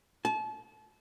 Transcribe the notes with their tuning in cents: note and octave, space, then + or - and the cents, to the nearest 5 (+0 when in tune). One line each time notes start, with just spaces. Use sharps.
A5 -35